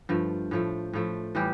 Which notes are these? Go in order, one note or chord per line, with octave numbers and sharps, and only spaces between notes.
G2 F3 A3
A2 F3 A3
A2 F3 A3
A2 E3 G3 G4